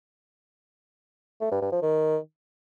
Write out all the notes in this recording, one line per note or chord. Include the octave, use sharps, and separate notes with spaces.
A3
G2
G2
F3
D#3